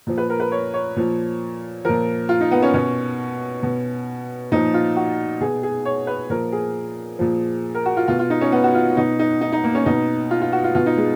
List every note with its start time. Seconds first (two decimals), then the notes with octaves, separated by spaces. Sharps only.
0.07 A#2 F3
0.18 B4
0.30 A#4
0.40 B4
0.52 C#5
0.74 C#5
0.96 A#2 F3
1.85 A#2 F3 A#4
2.29 F4
2.41 D#4
2.51 B3
2.62 C#4
2.74 B2 C#4
3.63 B2
4.52 A#2 F3 D#4
4.74 F4
4.96 F#4
5.40 B2 G#4
5.63 G#4
5.85 C#5
6.07 B4
6.30 A#2 F3 A#4
6.52 G#4
7.19 A#2 F3
7.74 A#4
7.86 F#4
7.97 F4
8.08 B2 F4
8.19 F4
8.30 D#4
8.41 C#4
8.52 B3
8.64 F#4
8.75 F4
8.97 B2 D#4
9.19 D#4
9.41 D#4
9.53 D#4
9.64 A#3
9.75 C#4
9.86 B2 D#4
10.31 F4
10.41 F4
10.53 F#4
10.64 F4
10.75 B2 F4
10.86 D#4
10.97 G#3